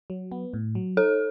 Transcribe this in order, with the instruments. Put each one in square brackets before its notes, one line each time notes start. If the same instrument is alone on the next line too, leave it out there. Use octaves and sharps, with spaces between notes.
[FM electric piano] F#3
B3
A2
F#3
[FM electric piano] D#4 [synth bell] A4